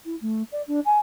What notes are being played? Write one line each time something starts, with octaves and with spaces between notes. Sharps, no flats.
E4
A3
D5
D4
G#5